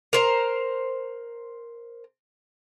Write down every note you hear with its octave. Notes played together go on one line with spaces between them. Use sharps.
A#4 C5 A#5